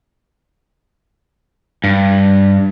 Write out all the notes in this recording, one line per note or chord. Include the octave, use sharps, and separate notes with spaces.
G2